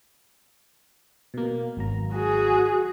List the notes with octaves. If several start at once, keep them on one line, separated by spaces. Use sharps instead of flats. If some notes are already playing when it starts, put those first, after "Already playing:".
B2 A#3
G#1 F#3 A#5
F#4 G#4